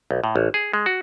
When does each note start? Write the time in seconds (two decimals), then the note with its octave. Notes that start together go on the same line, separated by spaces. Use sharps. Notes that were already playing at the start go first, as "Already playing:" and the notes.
0.11 B1
0.24 A2
0.36 A1
0.54 G#4
0.73 G#3
0.86 F#4